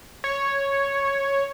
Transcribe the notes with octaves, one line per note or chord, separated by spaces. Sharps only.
C#5